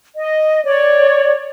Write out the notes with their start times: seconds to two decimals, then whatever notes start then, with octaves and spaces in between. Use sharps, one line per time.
0.15 D#5
0.64 C#5 D5